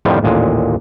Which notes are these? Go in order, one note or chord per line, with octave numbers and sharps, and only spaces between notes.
F2 A2 D3 D#3 F3 G3
A1 D#2 A#2 D3 G#3